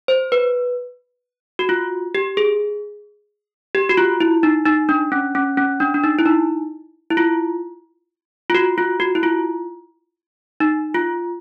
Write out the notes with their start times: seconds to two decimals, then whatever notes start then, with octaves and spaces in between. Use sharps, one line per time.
0.08 C5
0.32 B4
1.59 F#4
1.69 F4
2.15 G4
2.37 G#4
3.75 G4
3.89 F#4
3.97 F4
4.20 E4
4.43 D#4
4.66 D#4
4.89 D4
5.12 C#4
5.35 C#4
5.57 C#4
5.80 D4
5.94 D4
6.03 D#4
6.19 E4
6.26 D#4
7.10 E4
7.17 F4
8.50 F4
8.55 F#4
8.78 F4
9.00 F#4
9.15 E4
9.23 F4
10.60 D#4
10.94 F4